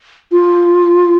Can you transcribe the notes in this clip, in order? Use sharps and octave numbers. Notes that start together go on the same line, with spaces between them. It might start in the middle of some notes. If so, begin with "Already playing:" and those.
F4